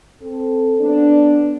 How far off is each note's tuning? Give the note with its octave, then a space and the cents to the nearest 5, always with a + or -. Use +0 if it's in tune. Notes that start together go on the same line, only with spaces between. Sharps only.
C4 +0 A4 +0
F#3 +0 B3 +0 D4 +0